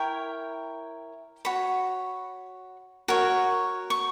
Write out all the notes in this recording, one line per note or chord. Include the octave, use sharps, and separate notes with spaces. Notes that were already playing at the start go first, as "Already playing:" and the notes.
Already playing: E4 A#4 C#5 G5
F#4 C#5 B5
F#4 A#4 C#5
C#6